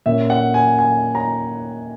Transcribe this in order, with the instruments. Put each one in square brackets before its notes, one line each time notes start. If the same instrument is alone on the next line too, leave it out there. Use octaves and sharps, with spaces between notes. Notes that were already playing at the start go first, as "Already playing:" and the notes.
[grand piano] A#2 A#3 C#4 E5
F#5
G#5
G#5
A#5